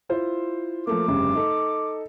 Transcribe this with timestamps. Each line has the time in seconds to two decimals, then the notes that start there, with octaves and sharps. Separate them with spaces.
0.09 E4 F4 C5
0.87 F3 A3 A#3 D6
1.08 F1 G2 C#3
1.35 D#4 A4